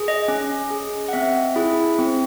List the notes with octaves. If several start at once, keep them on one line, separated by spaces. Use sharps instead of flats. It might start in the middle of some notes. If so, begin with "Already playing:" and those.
Already playing: G#4
D#5
C#4
G#4
F#5
C4 E5
E4 G#4
C4